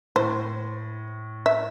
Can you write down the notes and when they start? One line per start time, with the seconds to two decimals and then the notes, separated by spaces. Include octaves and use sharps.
0.16 A2 C5
1.46 E5